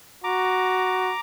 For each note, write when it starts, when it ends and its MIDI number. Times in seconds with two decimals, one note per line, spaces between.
0.24 1.14 66
0.24 1.21 82
0.24 1.21 86